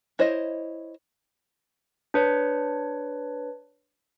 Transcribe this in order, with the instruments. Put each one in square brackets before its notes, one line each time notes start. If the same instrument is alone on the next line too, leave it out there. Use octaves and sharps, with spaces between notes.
[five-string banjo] E4 C5 C#5 D#5
[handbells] D4 B4 C#5